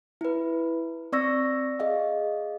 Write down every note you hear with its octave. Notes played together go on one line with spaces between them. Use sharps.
E4 B4
C4 D5 C#6 E6 A#6
G#4 D#5 F5